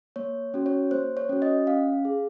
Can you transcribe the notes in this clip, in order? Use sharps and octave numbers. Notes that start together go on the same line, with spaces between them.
A#3 C#5
C#4 F#4
C#5
A#3 C5
C#5
C#4 F#4
D#5
C#4 F5
G#4